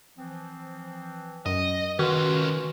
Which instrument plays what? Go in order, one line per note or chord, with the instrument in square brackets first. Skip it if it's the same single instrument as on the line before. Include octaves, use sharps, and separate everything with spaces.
[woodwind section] E3 F3 C4
[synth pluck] F#2 [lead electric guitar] D#5
[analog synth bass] D#3 [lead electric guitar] C#4 F4 [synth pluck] F#4 [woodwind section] B4